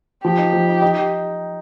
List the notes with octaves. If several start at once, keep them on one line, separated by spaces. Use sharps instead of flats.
F3 G4
D#4
F3
D#4
D#4